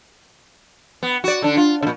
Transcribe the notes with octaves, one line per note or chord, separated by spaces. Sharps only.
B3
F#4 D5
D3 D4
F4
A#2 C#3